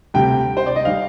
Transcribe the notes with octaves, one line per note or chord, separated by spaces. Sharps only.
D2 C3 G3 G5
C5
D5
D#5
D3 G3 F5